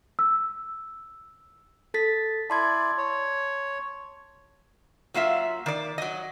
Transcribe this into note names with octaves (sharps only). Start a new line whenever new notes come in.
E6
A4 A6 B6
E4 D5 A5 C6 G#6
C#5
F#3 A#3 F4 E5
D#3 D5
F#3 D#5